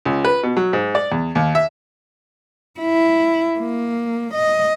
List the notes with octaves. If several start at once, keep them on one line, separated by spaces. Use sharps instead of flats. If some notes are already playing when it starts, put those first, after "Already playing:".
C#2
B4
B2
F#3
G#2
D5
E2
D#2
E5
E4
A#3
D#5